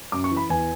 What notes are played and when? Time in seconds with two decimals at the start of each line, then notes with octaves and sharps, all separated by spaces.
0.12 F#2 D6
0.24 C#6
0.31 E3
0.37 B5
0.50 E2 G#5